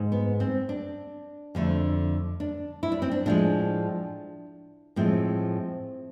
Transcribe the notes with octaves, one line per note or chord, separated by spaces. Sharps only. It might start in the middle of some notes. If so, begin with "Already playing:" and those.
Already playing: G#2 G#3
B3
C4
D4
F2 D3 A3
D4
E4
D4
C4
D4
A2 F3 G#3 D4
A2 F3 G#3 C4